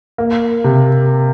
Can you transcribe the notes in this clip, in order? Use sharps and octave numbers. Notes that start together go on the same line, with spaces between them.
A#3
C3